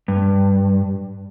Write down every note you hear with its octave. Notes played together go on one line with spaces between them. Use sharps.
G2